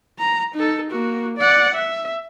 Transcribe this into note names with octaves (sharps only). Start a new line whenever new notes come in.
A#5
D#4 A4
A#3 F#4
D5 F#5
E5